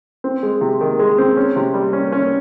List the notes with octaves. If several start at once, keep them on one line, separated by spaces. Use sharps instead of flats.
C4
G#3
C3
D#3
G#3
C4
C#4
C3
G3
C#4
C#4